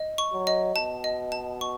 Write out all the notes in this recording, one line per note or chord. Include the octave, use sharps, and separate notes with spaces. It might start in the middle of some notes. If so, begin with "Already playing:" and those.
Already playing: D#5
C#6
F#3
D#5
B2 A5
D#5
A5
C#6